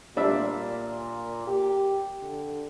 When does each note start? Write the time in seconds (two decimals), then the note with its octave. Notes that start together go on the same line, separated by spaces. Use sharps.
0.17 A#2 G3 D4 E5
1.47 G4
2.22 D3